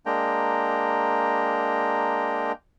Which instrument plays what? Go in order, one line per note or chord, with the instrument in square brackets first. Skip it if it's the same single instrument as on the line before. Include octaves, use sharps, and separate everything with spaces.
[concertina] G#3 A#3 D4 G5 A#5